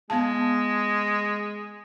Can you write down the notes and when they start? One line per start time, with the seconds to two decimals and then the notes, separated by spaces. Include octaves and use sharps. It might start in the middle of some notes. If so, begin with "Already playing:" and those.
0.10 G#3 B3 F5 A5